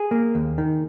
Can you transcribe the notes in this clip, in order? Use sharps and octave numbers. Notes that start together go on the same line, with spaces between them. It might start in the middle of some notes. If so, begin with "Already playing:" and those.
Already playing: G#4
A#3
D#2
D#3